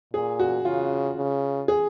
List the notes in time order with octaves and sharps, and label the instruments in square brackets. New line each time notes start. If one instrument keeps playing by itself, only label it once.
[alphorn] A#2 [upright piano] G#4
[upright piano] F#4
[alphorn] C#3 [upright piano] F4
[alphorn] C#3
[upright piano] G#4